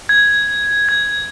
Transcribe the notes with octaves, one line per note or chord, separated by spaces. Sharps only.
G#6
G#6